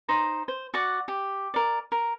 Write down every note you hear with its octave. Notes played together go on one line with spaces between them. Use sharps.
D#4 C5 A#5
C5
F#4 D5 F#5
G4
A#4 D5
A#4